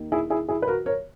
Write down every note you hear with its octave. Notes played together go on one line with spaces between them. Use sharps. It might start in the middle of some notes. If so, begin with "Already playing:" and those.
Already playing: D#2 D#3 A#3
E4 G#4
E4 G#4
E4 G#4
B4
F#4 A#4
A#4 C#5